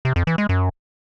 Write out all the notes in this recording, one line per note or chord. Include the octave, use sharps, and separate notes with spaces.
C3
F2
E3
G#3
F#2